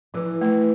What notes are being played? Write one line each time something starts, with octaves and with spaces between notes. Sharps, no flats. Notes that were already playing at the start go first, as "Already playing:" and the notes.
E3 F3
A3